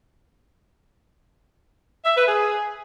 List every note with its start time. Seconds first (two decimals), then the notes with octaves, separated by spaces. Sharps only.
2.04 E5
2.16 B4
2.28 G#4